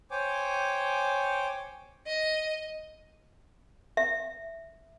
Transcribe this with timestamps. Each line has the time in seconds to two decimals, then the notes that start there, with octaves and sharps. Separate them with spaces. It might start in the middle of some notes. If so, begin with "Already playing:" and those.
0.11 C5 C#5 G5 G#5 D6
2.07 D#5
3.97 E5